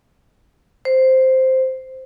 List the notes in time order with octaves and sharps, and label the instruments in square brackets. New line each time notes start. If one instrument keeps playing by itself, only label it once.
[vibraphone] C5